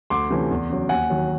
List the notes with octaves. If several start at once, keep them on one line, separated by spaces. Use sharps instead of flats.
D2 C6 D6
C3 E3 A3 C#4
E2
C#3 F#3
D#2 F#5 G#5
D#3 F#3